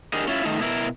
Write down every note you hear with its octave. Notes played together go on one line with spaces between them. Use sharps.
D4 G4 G#4 A#4 D#5
C#4 E4 F4
D#3 A3 D#4
B2 E4 A#4